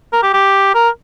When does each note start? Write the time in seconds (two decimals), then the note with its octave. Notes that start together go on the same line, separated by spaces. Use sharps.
0.13 A#4
0.23 G4
0.34 G4
0.75 A#4